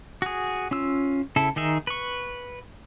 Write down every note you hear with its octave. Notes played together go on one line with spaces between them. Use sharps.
F#4 G#4
C#4 F4 E6
C#3 E4 A4
D#3 D#4 G#4 E5
B4 C#6